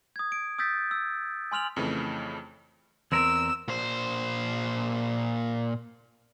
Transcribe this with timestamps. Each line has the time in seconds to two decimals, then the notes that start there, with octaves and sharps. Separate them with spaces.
0.16 D#6 G#6
0.32 D7
0.58 D#6 E6 G6 A6 B6
0.91 E6
1.52 G#5 C6 F6 F7 F#7
1.76 F2 C#3 E3 A3
3.12 E2 C4 A#4 E6
3.68 A#2 C5